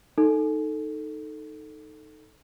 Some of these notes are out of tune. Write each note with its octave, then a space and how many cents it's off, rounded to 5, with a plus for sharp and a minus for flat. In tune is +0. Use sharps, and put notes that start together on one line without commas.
D#4 +0 A4 +0